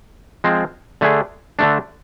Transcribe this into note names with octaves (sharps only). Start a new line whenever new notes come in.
F3 G#3 C4
D3 A3 D4 G#4
D3 A3 D4